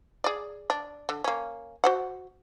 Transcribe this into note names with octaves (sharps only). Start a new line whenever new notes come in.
G#4 D5
D4
D3
A#3 C#4
F#4 C5 F#5